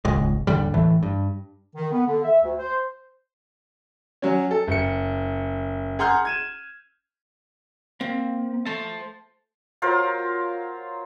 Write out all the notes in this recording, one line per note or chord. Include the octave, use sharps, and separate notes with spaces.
D#1 G#1 C#2 G#3
G#1 D#2 D3 G3
A2 E3 A3
G2
D#3
B3
D3
E5
D2
C5
F#3 C#4
A4
F#1 C#7
G#4 F#5 A#5 C6 F6 G6
G#6 D#7 E7
A#3 C4
A3 C5 A5
F#3 F4 A#4 C5